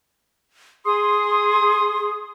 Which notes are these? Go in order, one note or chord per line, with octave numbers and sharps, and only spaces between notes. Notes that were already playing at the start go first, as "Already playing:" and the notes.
G#4 C6 D#6